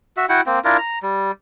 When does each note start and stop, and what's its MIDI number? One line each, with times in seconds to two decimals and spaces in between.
0.17 0.26 66
0.17 0.26 76
0.29 0.41 64
0.29 0.41 66
0.29 0.41 78
0.29 0.41 79
0.46 0.59 58
0.46 0.59 60
0.65 0.77 62
0.65 0.77 64
0.65 0.77 65
0.65 0.77 70
0.78 0.99 82
1.03 1.31 55